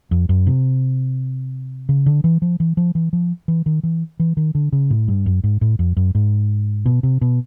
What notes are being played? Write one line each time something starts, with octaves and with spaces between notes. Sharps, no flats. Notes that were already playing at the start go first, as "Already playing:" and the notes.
F2
F#2
C3
C#3
D3
E3
F3
E3
F3
E3
F3
E3
D#3
E3
E3
D#3
D3
C#3
A2
G2
F#2
G#2
A2
F2
F#2
G#2
B2
C3
B2